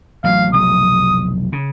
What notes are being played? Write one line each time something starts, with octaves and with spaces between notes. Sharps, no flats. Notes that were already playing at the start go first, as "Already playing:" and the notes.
A1 F#3 F5
F1 B1 D#6
C#3